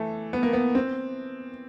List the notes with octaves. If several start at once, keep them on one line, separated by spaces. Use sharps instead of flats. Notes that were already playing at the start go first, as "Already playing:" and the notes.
Already playing: E3 A3
B3
A#3
B3
C4